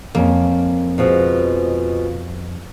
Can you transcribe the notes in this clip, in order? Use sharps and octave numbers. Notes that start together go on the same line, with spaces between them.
F2 A#3 C#4
B2 F3 G#3